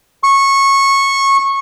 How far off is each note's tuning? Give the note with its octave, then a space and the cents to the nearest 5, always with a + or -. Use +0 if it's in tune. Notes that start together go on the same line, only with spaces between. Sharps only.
C#6 -15